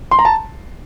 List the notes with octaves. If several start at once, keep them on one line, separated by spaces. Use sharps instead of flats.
C6
A#5
A5